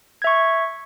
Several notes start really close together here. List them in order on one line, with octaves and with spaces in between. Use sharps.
G#6 E5 C#6